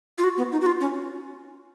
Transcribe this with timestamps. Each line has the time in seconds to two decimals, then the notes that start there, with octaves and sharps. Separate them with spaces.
0.18 F4
0.24 F#4
0.38 B3
0.52 D#4
0.61 F#4
0.66 F4
0.81 C#4